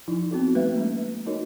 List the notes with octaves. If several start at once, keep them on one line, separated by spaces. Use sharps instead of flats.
F3 D#4 E4
B3 C4 F#4 A4
G3 A3 A#3 B4 E5
G#3 C#4
D#4 F#4 A#4 C#5 D#5